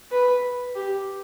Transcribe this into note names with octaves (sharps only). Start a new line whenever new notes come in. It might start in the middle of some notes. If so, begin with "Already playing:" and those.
B4
G4